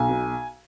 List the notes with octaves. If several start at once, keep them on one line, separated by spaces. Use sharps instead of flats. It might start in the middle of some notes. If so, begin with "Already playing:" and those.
Already playing: B1 G#5
B2